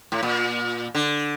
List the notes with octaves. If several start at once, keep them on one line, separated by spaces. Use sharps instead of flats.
A2
A#2
D3